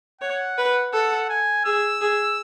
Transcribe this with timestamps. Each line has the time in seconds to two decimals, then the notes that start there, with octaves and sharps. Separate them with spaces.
0.21 C#5 F#5
0.58 B4
0.93 A4 F#5
1.29 G#5
1.65 G#4 E6
2.01 G#4